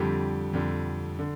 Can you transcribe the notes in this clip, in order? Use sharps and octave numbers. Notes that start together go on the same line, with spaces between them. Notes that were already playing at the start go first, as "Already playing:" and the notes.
Already playing: F2 D3 G3 G4
F2 D3 G3
D3